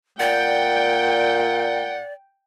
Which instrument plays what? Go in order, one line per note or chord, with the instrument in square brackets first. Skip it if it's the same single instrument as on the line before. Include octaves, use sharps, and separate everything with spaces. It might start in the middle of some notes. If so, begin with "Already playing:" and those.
[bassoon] A#2 [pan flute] D5 [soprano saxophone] F#5 [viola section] G5